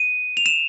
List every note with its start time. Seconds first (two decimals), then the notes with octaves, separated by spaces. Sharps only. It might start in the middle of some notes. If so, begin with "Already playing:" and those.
Already playing: D#7
0.37 F7
0.46 E7